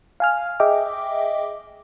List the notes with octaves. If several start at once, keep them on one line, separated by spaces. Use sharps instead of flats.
F5 G#5 F6
G#4 D#5 E5 G5 D6